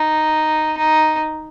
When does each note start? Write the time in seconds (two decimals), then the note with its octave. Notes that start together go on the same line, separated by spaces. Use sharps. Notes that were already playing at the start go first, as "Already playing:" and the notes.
Already playing: D#4
0.77 D#4